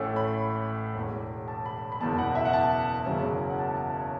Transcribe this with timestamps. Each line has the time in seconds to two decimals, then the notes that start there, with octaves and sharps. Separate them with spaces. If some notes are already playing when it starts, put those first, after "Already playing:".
Already playing: A1 A2 A3 C#4
0.16 B5
0.94 E1 E2 B2
1.48 A5
1.66 B5
1.92 B5
2.00 F#1 E2 B2 A5
2.18 F#5
2.35 E5
2.45 F#5
2.53 A5
3.06 F#1 E2 C#3 F#3 C#4
3.50 F#5
3.59 A5
3.71 F#5
3.76 A5
3.94 C#5